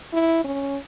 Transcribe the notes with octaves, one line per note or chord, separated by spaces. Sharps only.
E4
C#4